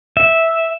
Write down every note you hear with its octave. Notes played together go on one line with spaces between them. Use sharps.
E5